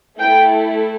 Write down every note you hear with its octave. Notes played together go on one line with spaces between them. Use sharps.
A3 E4 A4 G5